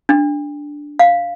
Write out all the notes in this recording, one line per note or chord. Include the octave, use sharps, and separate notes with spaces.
D4
F5